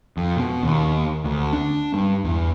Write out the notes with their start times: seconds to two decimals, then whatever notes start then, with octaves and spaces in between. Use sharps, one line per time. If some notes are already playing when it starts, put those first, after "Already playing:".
0.17 F2
0.37 B2
0.63 D#2
1.24 D2
1.53 D4
1.94 G2
2.24 E2